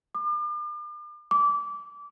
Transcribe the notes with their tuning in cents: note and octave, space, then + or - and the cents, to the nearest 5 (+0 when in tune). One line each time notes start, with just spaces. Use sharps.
D6 +40
D6 -20